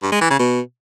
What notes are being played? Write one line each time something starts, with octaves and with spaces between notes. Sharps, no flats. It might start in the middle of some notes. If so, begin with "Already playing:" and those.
G2
G#3
E3
C#3
B2